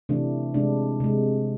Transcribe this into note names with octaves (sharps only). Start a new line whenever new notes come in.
C3 E3 A3 D4
C3 G#3 D4
C3 G#3